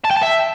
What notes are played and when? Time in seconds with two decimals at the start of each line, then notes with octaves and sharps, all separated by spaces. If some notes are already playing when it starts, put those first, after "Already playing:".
0.05 A5
0.11 G5
0.17 A5
0.23 E5